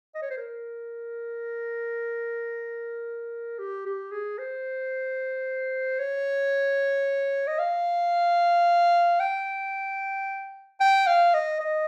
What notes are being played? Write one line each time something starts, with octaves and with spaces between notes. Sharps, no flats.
D#5
C#5
C5
A#4
G4
G4
G#4
C5
C#5
D#5
F5
G5
G5
F5
D#5
D#5